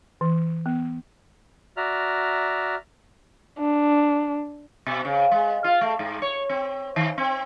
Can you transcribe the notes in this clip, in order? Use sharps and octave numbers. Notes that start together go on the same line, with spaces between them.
E3
B3
F#4 D5 E5 A#5 F6
D4
B2
C#3
G#3
F4
A3
G#2
C#5
C4
D#3
C4